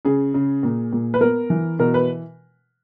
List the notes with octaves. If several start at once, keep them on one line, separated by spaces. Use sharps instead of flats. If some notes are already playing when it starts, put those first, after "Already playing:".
C#3 G#4
C#3
A#2
A#2
B4
B3 A#4
E3
B2 A#4
B4